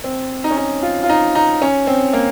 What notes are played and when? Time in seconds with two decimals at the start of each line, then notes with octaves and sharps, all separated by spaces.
0.04 C4
0.44 D#4
0.51 C#4
0.57 D#4
0.83 F4
1.03 F4
1.09 D#4
1.35 D#4
1.62 C#4
1.87 C4
2.13 A#3